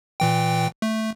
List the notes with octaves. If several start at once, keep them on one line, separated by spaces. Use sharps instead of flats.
A#2 E3 G5
A3